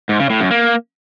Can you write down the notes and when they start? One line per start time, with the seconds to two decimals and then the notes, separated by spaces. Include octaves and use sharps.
0.09 G#2
0.20 C#3
0.30 A2
0.40 F#2
0.51 A#3